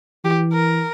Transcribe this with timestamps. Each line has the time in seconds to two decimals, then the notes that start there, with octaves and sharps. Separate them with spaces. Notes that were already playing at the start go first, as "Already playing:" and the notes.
0.25 E3 G4
0.53 A#4